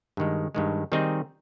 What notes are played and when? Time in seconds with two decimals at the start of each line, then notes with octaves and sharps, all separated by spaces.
0.17 G2 D#3 G#3
0.55 G2 D#3 G#3
0.92 D#3 G3 C4 D#4 G#4